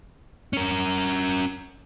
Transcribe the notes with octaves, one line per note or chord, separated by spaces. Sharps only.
C#4 A#4